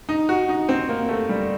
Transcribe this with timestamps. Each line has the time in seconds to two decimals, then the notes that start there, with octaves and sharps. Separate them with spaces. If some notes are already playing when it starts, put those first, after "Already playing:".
0.09 D#4
0.29 F#4
0.49 D#4
0.69 C4
0.89 A#3
1.09 A3
1.29 G3